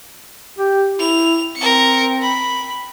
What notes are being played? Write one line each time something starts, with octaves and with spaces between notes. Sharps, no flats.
G4
E4 F7
C4 A#4 C#7
B5